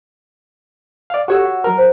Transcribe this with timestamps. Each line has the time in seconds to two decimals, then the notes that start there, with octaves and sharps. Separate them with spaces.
1.10 D5 F5
1.28 F#4 G4 A4 C#5 E6
1.45 F#5
1.64 F#3 A#4 A#5
1.78 C5